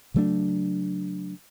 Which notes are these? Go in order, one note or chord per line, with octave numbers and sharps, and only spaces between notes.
C#3 F#3 A3 D4